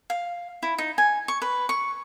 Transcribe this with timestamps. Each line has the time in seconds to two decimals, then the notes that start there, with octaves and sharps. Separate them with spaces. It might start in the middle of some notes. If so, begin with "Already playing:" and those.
0.10 F5
0.63 E4
0.78 D#4
0.98 G#5
1.28 C#6
1.42 B4
1.69 C#6